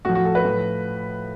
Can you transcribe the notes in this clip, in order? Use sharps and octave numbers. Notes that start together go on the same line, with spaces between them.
A2 F3 F#4
F#4
A4
B4
A2 F3